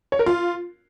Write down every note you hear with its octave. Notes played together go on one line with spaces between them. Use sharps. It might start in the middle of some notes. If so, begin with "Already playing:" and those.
C#5
A#4
F4